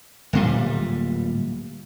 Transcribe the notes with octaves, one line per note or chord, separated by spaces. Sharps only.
D1 A#2 G3